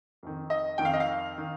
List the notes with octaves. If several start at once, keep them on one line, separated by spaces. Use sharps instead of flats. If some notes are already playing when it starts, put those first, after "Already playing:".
F2 D#3
D#5
F2 D#3 G5
F5
D#5
F5
D#3